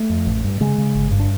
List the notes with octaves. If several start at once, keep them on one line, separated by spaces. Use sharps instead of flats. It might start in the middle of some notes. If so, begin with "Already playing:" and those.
Already playing: A3
F2
A1
G2
C#3 G#3
C#3
G1
G2
D4